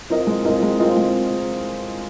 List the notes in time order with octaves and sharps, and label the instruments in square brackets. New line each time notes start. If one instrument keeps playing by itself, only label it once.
[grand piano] C4 F4 A#4 D#5
G#3
C4 F4 A#4 D#5
G#3
C4 F4 A#4 D#5
G#3